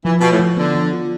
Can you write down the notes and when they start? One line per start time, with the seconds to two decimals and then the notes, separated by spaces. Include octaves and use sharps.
0.05 E3 F3
0.21 B2 F4
0.31 A2
0.39 F3
0.57 D3 B3
0.75 F3
0.93 F4